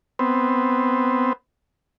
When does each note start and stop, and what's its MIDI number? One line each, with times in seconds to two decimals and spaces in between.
0.19 1.33 59
0.19 1.33 60